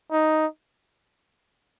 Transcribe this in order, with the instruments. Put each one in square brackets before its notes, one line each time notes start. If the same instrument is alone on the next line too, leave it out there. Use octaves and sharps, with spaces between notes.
[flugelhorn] D#4